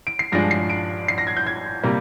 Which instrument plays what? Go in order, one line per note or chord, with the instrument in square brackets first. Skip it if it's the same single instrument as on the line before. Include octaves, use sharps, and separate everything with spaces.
[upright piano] D7
C7
G2 F3 G#3 D4 A#6
C7
D7
C7
A#6
G#6
G6
G#6
C3 G3 A#3